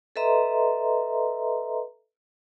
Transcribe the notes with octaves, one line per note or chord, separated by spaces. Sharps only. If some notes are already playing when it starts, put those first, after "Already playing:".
A4 B4 D#5 E5 A#5 C6